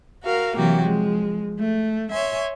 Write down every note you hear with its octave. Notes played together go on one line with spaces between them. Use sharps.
F#4 A#4 F5
C3 E3 F#3 A#3 F#4 G4
F3 G#3
A3
C#5 E5 G#5 C6